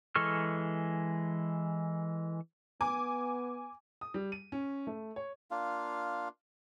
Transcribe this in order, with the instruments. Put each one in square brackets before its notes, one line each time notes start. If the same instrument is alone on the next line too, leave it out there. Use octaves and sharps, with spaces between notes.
[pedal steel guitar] E3 G#3 A4 C#6 F6
[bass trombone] B3 [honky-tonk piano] G#5 D6
[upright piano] D#6
G3
D#7
C#4
A3
C#5
[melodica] A#3 D4 F4 F5